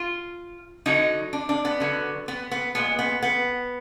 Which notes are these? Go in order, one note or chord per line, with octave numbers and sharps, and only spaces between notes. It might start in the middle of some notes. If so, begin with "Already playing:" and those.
Already playing: F4
D3 F#3 D#4
D4
D4
B3
D3 F#3
B3
B3
A#2 G#3 B3
B3
B3